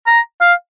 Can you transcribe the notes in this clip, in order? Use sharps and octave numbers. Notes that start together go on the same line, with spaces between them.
A#5
F5